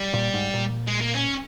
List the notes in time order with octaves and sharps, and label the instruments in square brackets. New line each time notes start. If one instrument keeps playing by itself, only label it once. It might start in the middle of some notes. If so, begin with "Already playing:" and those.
Already playing: [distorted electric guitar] G3
[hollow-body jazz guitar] A#2
G#2
A#2
[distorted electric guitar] G#3
A#3
C#4